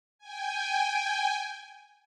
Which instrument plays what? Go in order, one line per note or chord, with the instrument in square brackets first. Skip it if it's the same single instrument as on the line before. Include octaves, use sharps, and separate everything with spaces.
[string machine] G5 G#5